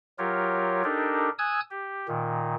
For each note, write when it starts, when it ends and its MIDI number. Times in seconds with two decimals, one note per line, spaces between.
0.19 0.83 54
0.19 0.83 65
0.19 0.83 67
0.19 0.83 70
0.19 0.83 73
0.84 1.30 62
0.84 1.30 63
0.84 1.30 67
0.84 1.30 69
0.84 1.30 70
1.39 1.60 80
1.39 1.60 87
1.39 1.60 88
1.39 1.60 90
1.39 1.60 92
1.71 2.07 67
2.08 2.55 46
2.08 2.55 51